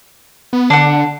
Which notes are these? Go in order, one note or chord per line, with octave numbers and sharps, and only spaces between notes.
B3
D3 D4 F#5